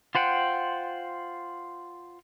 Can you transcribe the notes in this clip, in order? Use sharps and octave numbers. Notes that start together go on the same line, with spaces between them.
F4 C5 F#5 G5